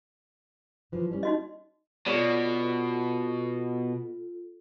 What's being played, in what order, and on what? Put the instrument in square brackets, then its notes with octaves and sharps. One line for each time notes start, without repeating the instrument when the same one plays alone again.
[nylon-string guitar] E3 F3
G3 C#4
[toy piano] D#4 F#4 D#5
[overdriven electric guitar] B2 [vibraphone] F4 A4 [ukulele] C#5 D5